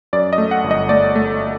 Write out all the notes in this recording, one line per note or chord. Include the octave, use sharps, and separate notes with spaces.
F#2 D5
D#5
A3
F#5
G1
D#5
A3 D5
A3